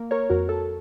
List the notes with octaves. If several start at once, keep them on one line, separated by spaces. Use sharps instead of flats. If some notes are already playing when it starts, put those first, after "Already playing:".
Already playing: A#3
A#4 C#5
F2 F#4 A#4
A4